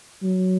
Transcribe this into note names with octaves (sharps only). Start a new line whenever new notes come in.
F#3